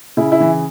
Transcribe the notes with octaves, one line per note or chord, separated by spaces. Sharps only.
C#3 E4
E4
E3